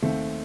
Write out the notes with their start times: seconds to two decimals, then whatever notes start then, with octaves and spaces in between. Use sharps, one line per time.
0.02 D#2 D#3 A3 C4